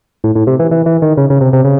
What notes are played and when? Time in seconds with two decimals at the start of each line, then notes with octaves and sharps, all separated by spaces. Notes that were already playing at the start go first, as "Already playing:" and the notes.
0.24 A2
0.35 A2
0.47 C3
0.60 E3
0.71 E3
0.86 E3
1.02 D#3
1.17 C#3
1.30 C#3
1.41 C3
1.53 C3
1.64 C#3